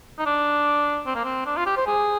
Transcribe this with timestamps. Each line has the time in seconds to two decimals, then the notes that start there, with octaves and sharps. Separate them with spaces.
0.19 D#4
0.26 D4
1.06 C4
1.15 A#3
1.25 C4
1.46 D4
1.57 F4
1.66 G4
1.77 C5
1.86 G#4